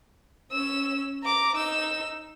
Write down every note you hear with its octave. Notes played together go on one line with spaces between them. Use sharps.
C#4 E6
A#5 D6
D#4 E6